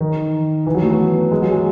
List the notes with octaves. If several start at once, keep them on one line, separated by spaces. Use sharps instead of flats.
D#3
E3
F#3
A3
B3
G#3
F#3
G#3